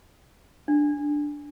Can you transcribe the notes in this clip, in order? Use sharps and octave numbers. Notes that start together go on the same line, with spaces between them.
D4